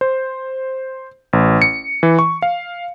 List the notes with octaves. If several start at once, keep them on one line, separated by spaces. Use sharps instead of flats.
C5
A1
C#7
E3
C#6
F5